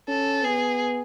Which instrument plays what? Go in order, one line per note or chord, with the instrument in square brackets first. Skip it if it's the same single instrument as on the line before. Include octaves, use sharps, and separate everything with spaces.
[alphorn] C#4 [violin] A4
[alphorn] B3 [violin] G#4